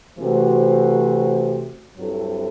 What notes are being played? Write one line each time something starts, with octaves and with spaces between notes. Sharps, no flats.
C3 E3 A3 C4 F#4
G2 F#3 C4 E4 A4